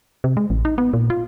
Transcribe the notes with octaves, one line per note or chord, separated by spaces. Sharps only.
C3
G#3
A1
D#4
B3
A#2
F4